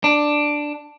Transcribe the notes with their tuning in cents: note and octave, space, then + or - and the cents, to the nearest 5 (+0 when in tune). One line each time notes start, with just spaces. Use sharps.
D4 +5